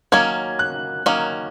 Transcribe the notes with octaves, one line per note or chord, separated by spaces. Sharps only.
D#3 F#3 A#3 C#4 G#6
F#6
D#3 F#3 A#3 C#4